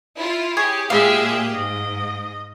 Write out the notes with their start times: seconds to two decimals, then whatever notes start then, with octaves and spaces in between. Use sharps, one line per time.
0.16 E4 F4
0.57 G4 G#4 C#5 G#5
0.90 A#2 G#3 G4 G#4 E5 F5
1.53 G#2 D#5